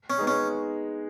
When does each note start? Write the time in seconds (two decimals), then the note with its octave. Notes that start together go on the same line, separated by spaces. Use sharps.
0.10 C#4
0.18 G#3 B3 D#4 G#4
0.27 C#4